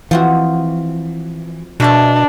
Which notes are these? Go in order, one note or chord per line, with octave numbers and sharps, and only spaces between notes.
E3 F3 C4 F#4
B2 D4 B4 E5 A5